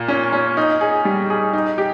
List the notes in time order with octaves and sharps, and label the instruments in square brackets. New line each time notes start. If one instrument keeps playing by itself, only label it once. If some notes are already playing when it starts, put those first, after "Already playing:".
Already playing: [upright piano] A#2 F4
C#4
C#4
D#4
G#4
G3
G#4
D#4
G4